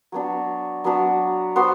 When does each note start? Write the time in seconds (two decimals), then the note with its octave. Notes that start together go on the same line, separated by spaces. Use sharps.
0.12 F#3 B3 D4 F#4
0.84 F#3 B3 D4 F#4
1.56 B3 F#4 C5